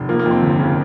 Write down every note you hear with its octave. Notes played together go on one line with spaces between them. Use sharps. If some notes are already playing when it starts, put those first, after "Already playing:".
Already playing: F1
F3 A#3
A#3
F2
C4
G1
C#3